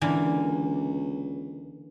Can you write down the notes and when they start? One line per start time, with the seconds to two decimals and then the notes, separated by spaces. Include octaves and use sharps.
0.01 C#2 D3 E3 A#3